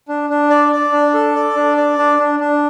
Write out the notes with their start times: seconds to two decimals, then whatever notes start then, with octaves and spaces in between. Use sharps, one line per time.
0.08 D4
0.30 D4
0.50 D5
0.72 D5
0.92 D4
1.14 A4
1.35 D5
1.55 D4
1.77 D5
1.98 D4
2.19 D4
2.39 D4